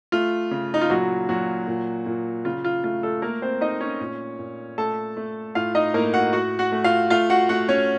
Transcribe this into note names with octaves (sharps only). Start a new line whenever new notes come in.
A3 F4
C#3
D#4
F4
A#2 F#3 F#4
A#2 F#3 F#4
A#2
A#2
C#3 F4
F4
A3 F4
A3 A4
A3 A#3 A#4
C4 C5
A3 D#4 D#5
C#4 C#5
A#2
A#2
A3 A4 A5
A3
A2 F4 F5
D#4 D#5
A2 A#3 A#4
F#4 F#5
A2 F#4 F#5
F#4 F#5
A3
F4 F5
A3 F4 F5
F#4 F#5
A3 F#4 F#5
C#4 C#5